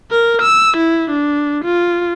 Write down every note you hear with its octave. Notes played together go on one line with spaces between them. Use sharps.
A#4
E6
E4
D4
F4